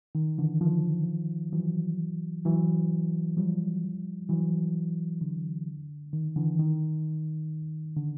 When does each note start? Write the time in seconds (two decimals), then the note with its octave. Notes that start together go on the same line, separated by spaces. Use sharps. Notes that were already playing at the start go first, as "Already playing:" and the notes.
0.15 D#3
0.38 D3 E3
0.61 D#3 F3
1.53 E3 F#3
2.45 E3 F#3
3.37 F3 G3
4.29 E3 F#3
5.21 D3
6.13 D#3
6.36 D3 E3
6.59 D#3
7.97 D3